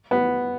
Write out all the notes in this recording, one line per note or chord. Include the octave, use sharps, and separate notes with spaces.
B3